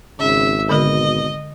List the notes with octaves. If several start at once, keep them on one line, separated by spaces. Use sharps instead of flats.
G#1 C#3 E5
B2 D3 G#3 A#4 D#5